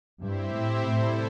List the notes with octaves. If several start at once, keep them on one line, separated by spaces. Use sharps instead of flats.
G2 C4 E4 G4 C5 E5
A2
A2 C3 G3 E4 A4 C5